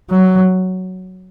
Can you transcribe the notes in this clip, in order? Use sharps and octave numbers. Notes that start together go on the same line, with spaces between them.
F#3